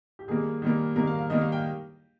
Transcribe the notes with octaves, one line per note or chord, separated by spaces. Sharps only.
G4
D#3 G3 A#3 G#4
D#3 G3 A#3
D#3 G3 A#3 A#4
F5
F5
D#3 G3 A#3 D#5
F5
G5